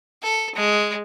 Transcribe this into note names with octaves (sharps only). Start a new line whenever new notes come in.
A4
G#3